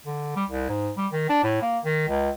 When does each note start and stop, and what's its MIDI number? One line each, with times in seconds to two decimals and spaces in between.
0.06 0.33 50
0.36 0.44 55
0.49 0.69 36
0.69 0.91 44
0.97 1.07 55
1.12 1.27 51
1.29 1.43 62
1.43 1.62 45
1.62 1.79 58
1.85 2.06 51
2.08 2.30 37